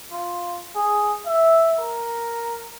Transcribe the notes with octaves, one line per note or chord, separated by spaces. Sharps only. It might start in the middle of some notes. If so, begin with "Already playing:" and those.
F4
G#4
E5
A#4